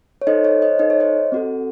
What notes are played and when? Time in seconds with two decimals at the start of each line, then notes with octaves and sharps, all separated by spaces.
0.22 C#5
0.27 D#4 A4 C5 D#5
0.44 C#5
0.62 C5 D#5
0.79 D#4 A4 D#5
0.90 C#5
1.00 C5 D#5
1.32 C4 F#4 A4